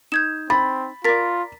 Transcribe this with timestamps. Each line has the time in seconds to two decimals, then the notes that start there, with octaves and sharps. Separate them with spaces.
0.12 D#4 G6 G#6 E7
0.50 C4 B5 A6
1.04 F4 A#4 D5 A6 B6